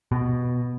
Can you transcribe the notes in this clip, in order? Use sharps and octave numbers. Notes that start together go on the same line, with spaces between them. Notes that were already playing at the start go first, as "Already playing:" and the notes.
B2